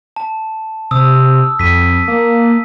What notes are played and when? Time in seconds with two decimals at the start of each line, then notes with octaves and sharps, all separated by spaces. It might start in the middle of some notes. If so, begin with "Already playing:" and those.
0.16 A5
0.91 C3 D#6 E6
1.59 F2 B6 D#7
2.08 A#3